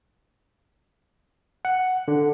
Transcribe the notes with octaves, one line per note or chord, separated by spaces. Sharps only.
F#5
D3